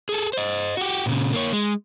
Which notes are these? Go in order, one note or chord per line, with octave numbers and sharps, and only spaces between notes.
G#4 A4
C5 D#5
F#4 G4
A#2 C#3
A#3 C#5
G#3